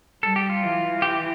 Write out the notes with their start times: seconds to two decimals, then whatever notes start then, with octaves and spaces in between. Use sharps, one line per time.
0.23 G3 A4
0.36 G4
0.49 F4
0.62 E3
1.02 G4